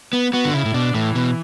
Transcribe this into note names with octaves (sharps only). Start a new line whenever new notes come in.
B3
B3 F#4
D3
C#3 E4
A2
B2 D4
A2 E3
B2